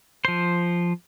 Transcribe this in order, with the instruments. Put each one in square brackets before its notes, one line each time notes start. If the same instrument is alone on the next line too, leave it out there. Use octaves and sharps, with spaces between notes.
[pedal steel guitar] F3 C5